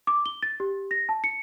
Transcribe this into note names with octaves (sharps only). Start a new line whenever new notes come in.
D6
G7
A6
G4
A#6
A5
C#7